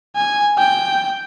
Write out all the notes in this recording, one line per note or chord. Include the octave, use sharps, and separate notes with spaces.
G#5
G5